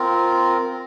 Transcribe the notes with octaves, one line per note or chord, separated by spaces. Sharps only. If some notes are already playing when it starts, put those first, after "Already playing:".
Already playing: C4 F4 A#4